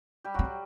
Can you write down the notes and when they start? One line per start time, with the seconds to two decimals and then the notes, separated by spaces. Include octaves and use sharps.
0.24 G3 G4
0.34 F#3 C4 F#4
0.44 G3